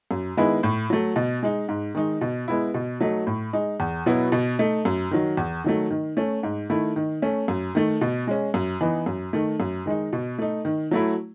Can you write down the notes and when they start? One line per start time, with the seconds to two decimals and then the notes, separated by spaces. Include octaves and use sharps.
0.11 F#2
0.37 D#3 G#3 B3 E4
0.63 A2
0.90 F#3 A3
1.16 B2
1.43 G#3 D#4
1.69 G#2
1.95 D#3 G#3 D#4
2.21 B2
2.48 G#3 B3 E4
2.74 B2
3.00 F#3 A3 D#4
3.27 A2
3.53 G#3 D#4
3.80 E2
4.06 B2 F#3 B3 E4
4.32 B2
4.59 A3 D#4
4.85 F#2
5.11 D#3 F#3
5.37 E2
5.64 D#3 F#3 A3
5.90 D#3
6.17 A3 C#4
6.43 G#2
6.70 D#3 A3 E4
6.96 D#3
7.22 A3 C#4
7.48 F#2
7.75 D#3 A3
8.01 B2
8.27 G#3 C#4
8.54 F#2
8.81 E3 B3 D#4
9.06 F#2
9.33 D#3 A3
9.60 F#2
9.86 D#3 G#3 D#4
10.13 B2
10.39 A3 D#4
10.65 D#3
10.91 F#3 A3 E4